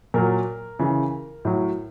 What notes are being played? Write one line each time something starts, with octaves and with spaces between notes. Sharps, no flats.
A#2 F#3 A#4
C#3 E3
A2 F#3